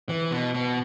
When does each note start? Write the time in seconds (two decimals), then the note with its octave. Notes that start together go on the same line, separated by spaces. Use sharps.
0.09 E3
0.32 B2
0.54 B2